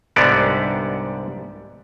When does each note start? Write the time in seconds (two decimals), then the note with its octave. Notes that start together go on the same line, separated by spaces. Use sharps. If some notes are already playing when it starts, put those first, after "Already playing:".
0.16 C2 G#2 D3 G3 B3 D5